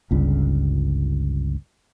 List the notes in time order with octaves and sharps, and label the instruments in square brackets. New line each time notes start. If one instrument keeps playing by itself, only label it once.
[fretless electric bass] G1 C#2 G3